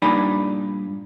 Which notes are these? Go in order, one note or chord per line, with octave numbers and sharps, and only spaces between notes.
G2 A#2 D#4 D5 G#5 B5